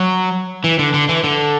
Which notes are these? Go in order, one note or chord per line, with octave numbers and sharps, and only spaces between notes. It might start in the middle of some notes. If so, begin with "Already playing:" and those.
Already playing: F#3
E3
D3
D3
E3
D3